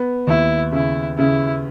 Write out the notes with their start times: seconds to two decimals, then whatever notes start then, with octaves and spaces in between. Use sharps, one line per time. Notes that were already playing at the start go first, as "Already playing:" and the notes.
Already playing: B3
0.27 D#2 E4
0.72 C#3 E4
1.18 C#3 E4